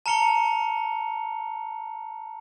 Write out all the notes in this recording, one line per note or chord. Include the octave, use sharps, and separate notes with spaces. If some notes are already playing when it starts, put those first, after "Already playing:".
A5 A#5 F6 C#7 F7 G7